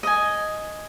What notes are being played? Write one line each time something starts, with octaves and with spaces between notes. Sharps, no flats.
D#5 G#5